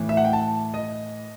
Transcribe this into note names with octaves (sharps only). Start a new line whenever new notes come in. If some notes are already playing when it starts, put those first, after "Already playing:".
Already playing: A2 E3
E5
F#5
G5
A5
D#5